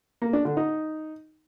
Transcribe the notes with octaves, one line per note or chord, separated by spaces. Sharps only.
A#3
D4
D3
D#4